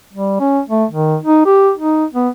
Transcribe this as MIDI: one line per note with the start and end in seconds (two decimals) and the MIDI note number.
0.13 0.40 55
0.40 0.61 61
0.69 0.85 57
0.91 1.17 51
1.23 1.45 63
1.46 1.71 67
1.77 2.05 63
2.14 2.29 59